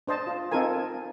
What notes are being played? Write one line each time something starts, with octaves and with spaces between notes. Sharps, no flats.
D4 C5 D#5 A5
F4
C4 D#4 F4 A4 A#4 G#5